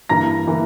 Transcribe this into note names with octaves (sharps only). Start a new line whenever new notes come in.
G2 E3 A#3 E4 A#5 A#6
E3 A#3 E4